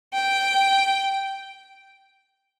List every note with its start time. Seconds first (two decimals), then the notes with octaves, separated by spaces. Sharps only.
0.14 G5